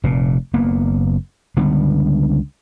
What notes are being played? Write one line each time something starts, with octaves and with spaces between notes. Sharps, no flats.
F1 A#2
F#1 A#3 B3
C#2 D3 G3 B3